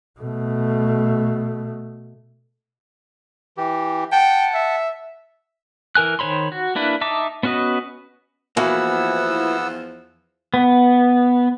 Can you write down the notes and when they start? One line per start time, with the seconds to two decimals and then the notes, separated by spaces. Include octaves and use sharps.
0.20 B2 A3
3.57 E3 G4
4.12 F#5 G5 A5
4.54 E5
5.95 E3 A#4 G#5 F#6
6.19 D#3 C5 C#5 B5 C6
6.52 F#4
6.75 A#3 D4 E4 B4
7.01 D#4 E5 A5 D6
7.43 B3 C#4 F#4 B4 D#5
8.57 E2 E3 F3 A#3 B3 F#4 F#5 E6
10.54 B3